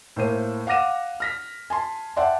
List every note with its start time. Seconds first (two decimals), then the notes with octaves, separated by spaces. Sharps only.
0.16 A2 A#3 C5 D#7
0.67 F5 F#5 D6 A#6 D#7 E7
1.20 F6 A#6 B6
1.70 G#5 A5 C6
2.17 D5 E5 F#5 G5 A5 C6